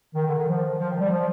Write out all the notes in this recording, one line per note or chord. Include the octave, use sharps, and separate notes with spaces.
D#3
D3
D#3
F3
F3
D#3
G3
F3